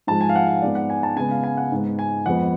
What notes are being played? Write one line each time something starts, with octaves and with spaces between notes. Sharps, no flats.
G#2 F3 G#3 A5
G#5
F5
F#5
F5
G#2 G#3 B3 D5
F#5
G#5
A5
C#3 G#3 B3 G#5
F5
G#5
F#5
G#2 G#3 B3
G#5
F2 F3 G#3 B3 F#5